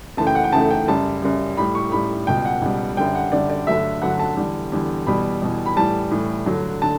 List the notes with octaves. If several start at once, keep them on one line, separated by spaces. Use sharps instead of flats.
F#2 C#3 E3 A3 A5
G5
F#5
G5
F#2 C#3 E3 A3 A5
G5
F#2 C#3 G3 A5
F#2 C#3 G3
A2 G3 B5
C#6
A2 G3 B5
C#2 B2 G3 G5
F#5
C#2 B2 G3
F#2 D3 G3 G5
F#5
F#2 D3 G3 D5
D5
G2 D3 F#3 A3 E5
G2 D3 F#3 A3 F#5
A5
E2 D3 G3
E2 D3 G3
E2 B2 G3 B5
E2 B2 G3
B5
A2 E3 G3 A5
A2 E3 G3
G2 D3 F#3 A3
D3 A5